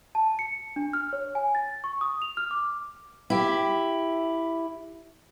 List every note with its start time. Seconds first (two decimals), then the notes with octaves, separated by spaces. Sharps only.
0.15 A5
0.39 C#7
0.76 D4
0.93 F6
1.13 C#5
1.35 G#5
1.55 A6
1.84 C#6
2.01 D#6
2.22 F7
2.37 F6
2.51 D6
3.30 E4 G4